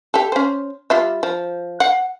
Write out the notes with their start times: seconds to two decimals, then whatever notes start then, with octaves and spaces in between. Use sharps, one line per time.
0.14 G4 A4
0.32 C#4 C5
0.90 G3 F4 E5
1.23 F3
1.80 F5 F#5